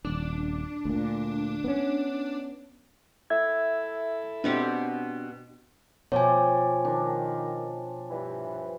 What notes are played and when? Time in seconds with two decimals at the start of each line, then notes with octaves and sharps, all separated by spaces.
0.05 D#1 D4
0.85 D2 A#2
1.64 B3 C#4
3.30 E4 A4 E5 G#6
4.44 B2 C4 D4 G4
6.12 B2 F3 C#5 D5 G5 G#5
6.85 D#3 D4
8.10 G2 E3